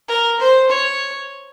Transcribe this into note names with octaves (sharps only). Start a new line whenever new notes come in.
A#4
C5
C#5